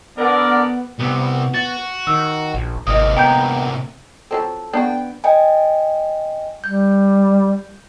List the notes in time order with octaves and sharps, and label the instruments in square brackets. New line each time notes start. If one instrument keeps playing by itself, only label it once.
[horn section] D3 A#4 [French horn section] B3 [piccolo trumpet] D5
[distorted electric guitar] C2 C3 [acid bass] B3
[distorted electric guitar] F#4 [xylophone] A6
[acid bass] D#3 [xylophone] E6
[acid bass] A#1
[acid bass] G#1 [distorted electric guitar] C3 A#3 [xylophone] D#5 D#6
[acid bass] B3 [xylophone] G5 A#5 G6
[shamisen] F3 F#3 C4 [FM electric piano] A4
[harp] B3 [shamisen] D4 F#4 [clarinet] G5
[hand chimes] D#5 G5 G#5
[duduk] G3 [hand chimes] G6